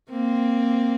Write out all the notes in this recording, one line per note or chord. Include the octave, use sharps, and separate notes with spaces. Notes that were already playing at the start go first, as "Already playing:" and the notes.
A#3 C4